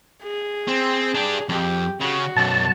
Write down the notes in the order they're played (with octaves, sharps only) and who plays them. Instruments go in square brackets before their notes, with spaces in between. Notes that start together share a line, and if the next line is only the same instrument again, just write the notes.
[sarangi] G#4
[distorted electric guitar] C4
D4 G4
[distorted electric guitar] F2 [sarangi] G4
[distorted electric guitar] C#3 [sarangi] F#4
[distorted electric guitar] B1 F#2 [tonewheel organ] A5